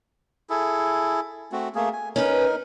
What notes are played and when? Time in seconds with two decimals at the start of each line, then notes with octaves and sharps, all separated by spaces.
0.50 E4 G#4 A4
1.52 A3 C4 F#4
1.75 A3 A#3 G#4
1.93 G#5
2.16 C#4 D#4 A#4 B4